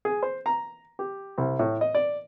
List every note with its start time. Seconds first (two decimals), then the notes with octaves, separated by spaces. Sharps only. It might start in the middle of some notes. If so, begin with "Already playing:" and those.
0.05 G#4
0.23 C5
0.46 A#5
0.99 G4
1.38 C2
1.59 A2
1.81 D#5
1.95 D5